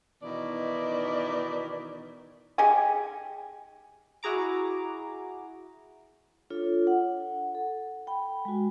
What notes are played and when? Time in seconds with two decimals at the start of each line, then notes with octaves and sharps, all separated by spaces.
0.22 B2 D#3 E3 D#4 E4 D5
2.58 D#4 G4 G#4 G#5
4.23 E4 F#4 G#4 A#5 D6
6.50 D4 F4 A4 C#5
6.87 F#5
7.55 A4
8.07 G5 B5
8.45 G#3 F#4